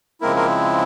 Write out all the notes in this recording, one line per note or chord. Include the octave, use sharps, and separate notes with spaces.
C#3 F3 G#3 A#3 C4 E4 A#4
A#3 A#4